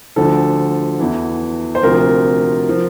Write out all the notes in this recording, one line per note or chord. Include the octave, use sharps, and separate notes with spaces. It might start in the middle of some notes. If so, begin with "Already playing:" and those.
D2 D3 F3 A4
E2 E3
C5
D2 C3 F3 A#4
F3